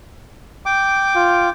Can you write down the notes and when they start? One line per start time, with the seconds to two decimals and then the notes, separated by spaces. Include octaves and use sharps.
0.66 G5 D6
1.16 F4